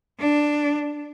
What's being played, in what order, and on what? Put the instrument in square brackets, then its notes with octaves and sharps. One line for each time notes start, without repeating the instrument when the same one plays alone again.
[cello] D4